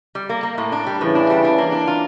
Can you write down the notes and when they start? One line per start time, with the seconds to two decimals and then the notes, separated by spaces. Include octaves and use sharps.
0.15 G3
0.29 A#3
0.43 A#3
0.58 A2
0.72 D4
0.86 G3
1.00 A2 C#3 E3
1.15 D4
1.30 G3
1.44 D4
1.58 A#3
1.72 D4
1.87 F4